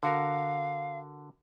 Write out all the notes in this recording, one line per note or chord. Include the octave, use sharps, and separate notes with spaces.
D3 F#4 A#4 F5